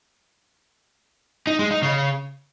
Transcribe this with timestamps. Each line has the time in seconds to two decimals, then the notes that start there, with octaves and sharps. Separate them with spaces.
1.47 D#4
1.59 G#3
1.71 D#4
1.83 C#3